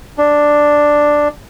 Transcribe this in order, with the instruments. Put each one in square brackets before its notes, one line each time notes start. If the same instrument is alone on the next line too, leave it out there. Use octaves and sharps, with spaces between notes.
[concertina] D4